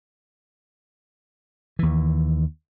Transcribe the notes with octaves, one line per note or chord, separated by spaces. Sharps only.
D#2 E3